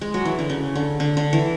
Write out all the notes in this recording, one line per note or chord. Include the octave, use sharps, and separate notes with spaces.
G#3
F#3
E3
D3
C#3
D3
D3
D3
E3